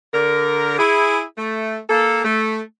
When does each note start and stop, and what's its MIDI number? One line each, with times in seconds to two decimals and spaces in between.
0.14 0.79 50
0.14 0.79 70
0.79 1.24 64
0.79 1.24 68
1.38 1.79 57
1.90 2.22 58
1.90 2.22 69
2.25 2.62 57